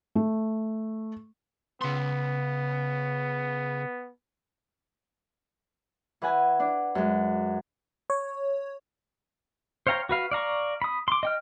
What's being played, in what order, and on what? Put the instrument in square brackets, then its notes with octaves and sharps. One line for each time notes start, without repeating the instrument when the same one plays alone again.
[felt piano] A3
[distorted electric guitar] C#3 C6 [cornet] B3
[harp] E3 B4 F#5 G#5
D4
F#2 G#3
[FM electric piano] C#5
[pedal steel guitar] C5 C#5 F5 G5 A#5
F#4 B4 F5
D5 F5 A#5 C#6
B5 D#6
C6 D6
D#5 G5 F6